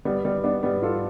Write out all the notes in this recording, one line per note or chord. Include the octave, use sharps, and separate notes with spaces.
G3 B3
G3 B3
B3 D4
G3 B3
F4 A4